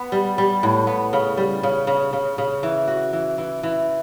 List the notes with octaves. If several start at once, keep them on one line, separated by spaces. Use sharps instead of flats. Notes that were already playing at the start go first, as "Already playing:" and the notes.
Already playing: B3
G3
G3
A2
B3
C#3
G3
C#3
C#3
C#3
C#3
E3
F#4
E3
E3
E3